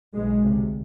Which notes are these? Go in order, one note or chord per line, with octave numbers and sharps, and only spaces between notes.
B1 B2 G#3
D2 C3